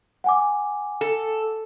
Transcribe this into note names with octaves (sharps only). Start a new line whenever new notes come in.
F#5 G#5 D6
A4